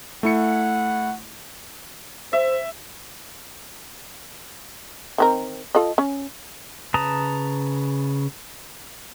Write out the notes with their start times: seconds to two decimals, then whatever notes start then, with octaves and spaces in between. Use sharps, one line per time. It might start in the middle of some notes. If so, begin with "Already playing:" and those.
0.23 A3 E4 F#5 C#7
2.33 C5 E5
5.18 D#3 C4 A#4
5.75 F4 A4 D#5
5.98 C#4
6.94 C#3 B4 A5 A#5 D#6